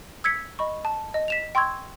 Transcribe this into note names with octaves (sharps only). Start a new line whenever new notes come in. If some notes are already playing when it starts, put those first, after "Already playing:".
E6 G#6 B6 C#7
D#5 B5 C#6
A5
D#5
B6 E7 F7
G5 C6 C#6 E6 G#6